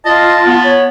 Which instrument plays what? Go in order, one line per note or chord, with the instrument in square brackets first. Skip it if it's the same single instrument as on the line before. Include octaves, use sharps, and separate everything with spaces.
[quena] F4 [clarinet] D#5 [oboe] A5
[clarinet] B3
[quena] C#5